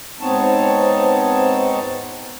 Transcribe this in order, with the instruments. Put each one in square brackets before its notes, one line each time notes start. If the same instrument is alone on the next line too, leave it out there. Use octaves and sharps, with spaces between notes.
[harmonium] G#2 B3 C4 D#4 C#5 A5